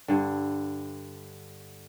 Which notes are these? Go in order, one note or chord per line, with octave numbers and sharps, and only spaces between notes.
G2 D3